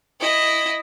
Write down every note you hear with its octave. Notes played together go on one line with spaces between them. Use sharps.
E4 D#5